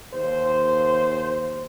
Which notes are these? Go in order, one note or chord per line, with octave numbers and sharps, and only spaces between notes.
D#2 C5